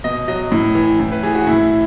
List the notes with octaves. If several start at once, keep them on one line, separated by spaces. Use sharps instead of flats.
B2 D#5
F#3 D#5
A2
E3
A2
B4
E3 G#4
F#4
A2 E4